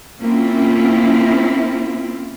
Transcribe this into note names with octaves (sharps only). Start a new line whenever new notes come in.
A#3 C4 C#4 E4 F4